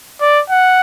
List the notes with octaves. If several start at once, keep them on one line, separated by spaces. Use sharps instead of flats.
D5
F#5